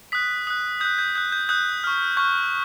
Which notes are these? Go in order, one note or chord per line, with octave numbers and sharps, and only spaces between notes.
D#6 F#6 B6
D#6 F#6
D#6 F#6 G6
G6
D#6 F#6 G6
G6
D#6 F#6 G6
C#6 F6
C#6 F6 G6